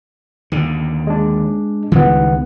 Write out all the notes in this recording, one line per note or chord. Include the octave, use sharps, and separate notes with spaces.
D#2 D3
G#3 D4
C#2 D#3 E3 G3 B3